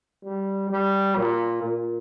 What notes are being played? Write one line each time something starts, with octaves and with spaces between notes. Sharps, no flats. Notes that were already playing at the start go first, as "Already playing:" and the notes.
G3
G3
A#2
A#2